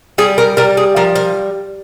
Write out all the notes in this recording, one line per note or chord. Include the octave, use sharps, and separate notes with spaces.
G3 G#4
A#4
G3 A#4
G#4
F3 A#4
A#4